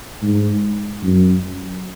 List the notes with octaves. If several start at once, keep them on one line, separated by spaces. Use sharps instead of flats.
G#2
F#2